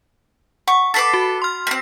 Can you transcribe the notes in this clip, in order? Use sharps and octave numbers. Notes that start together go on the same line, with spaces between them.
F#5 C#6
A4 B4 D6 A6 B6 C7
F#4
C6 F6
A#3 C4 B6